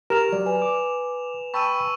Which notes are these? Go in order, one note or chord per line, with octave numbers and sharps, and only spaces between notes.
G4 A#4 A#5 F6 E7 F7
F#3 D5
B4 G#5
D6
G5 A5 B5 C#6 E6 D#7